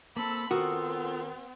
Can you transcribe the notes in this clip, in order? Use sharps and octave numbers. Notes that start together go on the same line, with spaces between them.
A#3 C4 A4 A5 B5
D#3 B3 C4 F4 F#4 A4 A#4 D#6